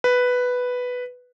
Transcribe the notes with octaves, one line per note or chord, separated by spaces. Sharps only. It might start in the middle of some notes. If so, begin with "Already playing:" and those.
B4